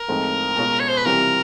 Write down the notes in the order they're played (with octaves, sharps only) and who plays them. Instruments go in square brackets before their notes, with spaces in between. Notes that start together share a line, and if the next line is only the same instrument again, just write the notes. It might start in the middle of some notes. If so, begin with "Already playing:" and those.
Already playing: [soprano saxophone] A#4
[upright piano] A2 F3 G#3 C4 D#4
B2 G#3 C#4 F4
[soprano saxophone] C#5
C5
B4
[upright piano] C3 E3 G3 C4 F4 [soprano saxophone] A#4